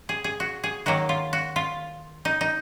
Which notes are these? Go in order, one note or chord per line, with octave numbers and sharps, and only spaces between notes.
G#4
G#4
F#4
G#4
D#3 F#3 A#3 F#4
F4
F#4
F4
D#4
D#4